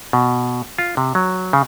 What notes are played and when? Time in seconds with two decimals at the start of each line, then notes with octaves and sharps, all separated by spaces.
0.13 B2
0.78 F4
0.97 C3
1.15 F#3
1.53 C#3